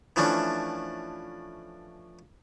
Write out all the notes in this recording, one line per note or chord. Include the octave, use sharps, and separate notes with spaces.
E3 F3 A3 C#4 D4